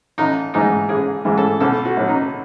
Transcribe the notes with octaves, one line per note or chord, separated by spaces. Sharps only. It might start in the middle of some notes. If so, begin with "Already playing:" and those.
A1 D#4
G#2 E3 G#3 D#4
A1 G#4
G#2 E3 G#3
A4
B1 A4
F#4
A2 F#3
D#4